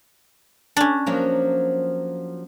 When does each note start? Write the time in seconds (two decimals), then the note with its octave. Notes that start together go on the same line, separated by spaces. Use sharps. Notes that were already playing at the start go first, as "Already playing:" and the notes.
0.77 C#4 D4
1.06 F3 F#3 A#3